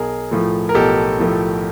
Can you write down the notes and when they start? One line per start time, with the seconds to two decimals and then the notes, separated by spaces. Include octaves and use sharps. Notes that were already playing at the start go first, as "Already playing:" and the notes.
Already playing: B1 G#4 A#4
0.31 A2 F3 A3
0.69 A#4
0.75 B1 G4 A4
1.19 A2 F3 A3